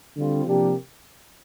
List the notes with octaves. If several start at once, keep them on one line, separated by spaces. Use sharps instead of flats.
D3 G3 C4 F4
C3 F3 A#3 D4 G4